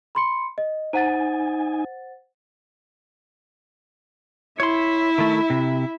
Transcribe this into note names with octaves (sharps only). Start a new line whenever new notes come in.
B5 C6 C#7
D#5
D#4 C5 F#5 G#5 A6
E4 C#5 E5 C6
D#3 A3
C3